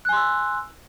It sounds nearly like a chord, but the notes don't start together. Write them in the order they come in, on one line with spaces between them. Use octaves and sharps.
F#6 G#5 C6 E6